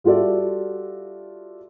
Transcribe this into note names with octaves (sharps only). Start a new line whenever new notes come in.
G3 F4 F#4 A4 D5 E5